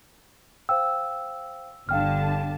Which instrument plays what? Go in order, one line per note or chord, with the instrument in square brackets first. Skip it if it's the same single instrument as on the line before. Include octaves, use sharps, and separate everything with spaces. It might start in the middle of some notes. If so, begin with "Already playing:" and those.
[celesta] C5 F5 G5 [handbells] E6
[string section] G1 D3 A5 [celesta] F5 G5 F6